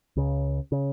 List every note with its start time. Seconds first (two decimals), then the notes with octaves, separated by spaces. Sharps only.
0.16 C#2 C#3
0.72 C#3